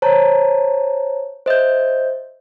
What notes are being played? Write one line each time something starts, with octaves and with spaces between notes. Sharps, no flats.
C5 C#5 A5 A#5
C5 D#5 E5 G6